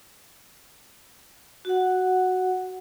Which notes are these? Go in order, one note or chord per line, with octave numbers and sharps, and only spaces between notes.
F#4 F#5